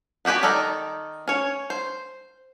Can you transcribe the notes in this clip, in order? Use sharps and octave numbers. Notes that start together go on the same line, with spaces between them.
B3 F#4 G4 B4 G#5
D#3 A4 D5 A#5
C#4 C#5
C5